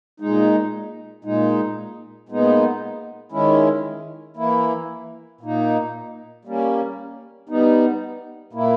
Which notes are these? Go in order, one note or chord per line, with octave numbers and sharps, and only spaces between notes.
A#2 G#3 D#4
A#2 G#3 D#4
A#2 G#3 B3 D#4
D#3 G#3 C#4 E4
E3 A#3 E4
A#2 A#3 D#4
G3 A#3 C#4
G3 B3 D#4
A#2 A#3 E4